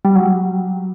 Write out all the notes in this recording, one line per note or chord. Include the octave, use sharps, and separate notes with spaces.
G3
F#3